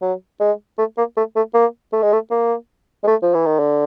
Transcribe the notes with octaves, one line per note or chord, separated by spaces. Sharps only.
F#3
G#3
A3
A#3
A3
A3
A#3
A3
G#3
A3
A#3
G#3
A3
F3
E3
D#3
D3